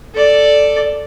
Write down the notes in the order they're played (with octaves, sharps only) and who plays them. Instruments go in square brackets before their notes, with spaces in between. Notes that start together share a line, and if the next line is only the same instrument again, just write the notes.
[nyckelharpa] A4 D5